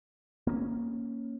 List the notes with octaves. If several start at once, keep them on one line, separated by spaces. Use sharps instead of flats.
A#3 C4 C#4